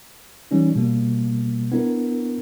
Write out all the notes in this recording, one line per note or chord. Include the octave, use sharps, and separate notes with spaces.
E3 G3 C#4 D#4
B2 G3 A#3
B3 D4 E4 A#4